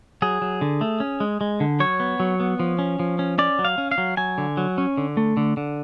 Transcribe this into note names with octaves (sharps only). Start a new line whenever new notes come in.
F#3 G#4
F#3
D3
A3
C#4
G#3
G#3
D3
F#3 C#5
B3
F#3
B3
F3
C#4
F3
C#4
C#4 D5
F#3
F5
C#4
F5
F#3
F#3 G#5
D3
F#3
C#4
D3
A3
D3
D3